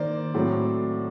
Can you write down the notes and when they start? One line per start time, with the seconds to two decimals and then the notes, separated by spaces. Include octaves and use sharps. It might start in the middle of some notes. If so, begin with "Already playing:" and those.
Already playing: D#3 A#3 C5 D5
0.34 A2 F#3 A3 C4